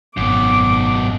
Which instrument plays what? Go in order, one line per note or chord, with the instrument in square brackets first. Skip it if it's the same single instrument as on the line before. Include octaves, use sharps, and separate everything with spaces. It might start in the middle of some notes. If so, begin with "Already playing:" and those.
[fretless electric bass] G#1 [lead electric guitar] F#2 B2 [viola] D6